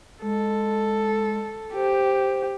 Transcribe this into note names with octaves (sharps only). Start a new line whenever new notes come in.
G#3 A4
G4 C5